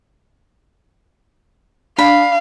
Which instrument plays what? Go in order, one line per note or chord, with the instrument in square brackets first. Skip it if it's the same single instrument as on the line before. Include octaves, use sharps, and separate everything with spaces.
[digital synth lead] D4 [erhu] F5 [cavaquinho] B5